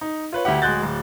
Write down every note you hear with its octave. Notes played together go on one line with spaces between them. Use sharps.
D#4
F4 B4 C#5
D2 E4 G4 F#5
D1 G#3 F#4 F#6 G6 A6
D1